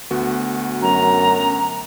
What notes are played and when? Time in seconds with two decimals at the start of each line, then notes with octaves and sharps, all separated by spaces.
0.11 D2 B3 F#4
0.82 F#2 A#5